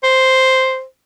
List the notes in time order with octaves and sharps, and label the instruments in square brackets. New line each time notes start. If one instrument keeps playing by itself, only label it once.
[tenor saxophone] C5